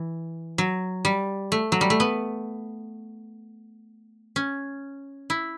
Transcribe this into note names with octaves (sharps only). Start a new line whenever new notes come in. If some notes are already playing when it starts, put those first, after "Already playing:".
Already playing: E3
F#3
G3
A3
F#3
G3
A3
B3
C#4
E4